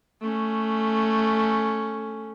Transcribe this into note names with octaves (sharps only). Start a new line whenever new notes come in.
A3 C#4